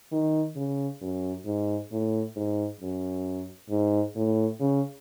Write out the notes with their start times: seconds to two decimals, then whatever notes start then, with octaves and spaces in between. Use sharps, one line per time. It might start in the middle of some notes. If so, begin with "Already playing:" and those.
0.12 D#3
0.56 C#3
1.02 F#2
1.46 G#2
1.92 A2
2.36 G#2
2.81 F#2
3.70 G#2
4.16 A2
4.60 C#3